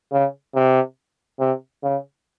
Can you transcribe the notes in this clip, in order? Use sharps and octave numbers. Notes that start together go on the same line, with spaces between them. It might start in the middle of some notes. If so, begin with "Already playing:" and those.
C#3
C3
C3
C#3